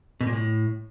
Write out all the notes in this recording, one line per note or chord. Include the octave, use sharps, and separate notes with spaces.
B2
A#2
A2